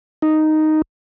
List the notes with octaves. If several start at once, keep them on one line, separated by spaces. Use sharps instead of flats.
D#4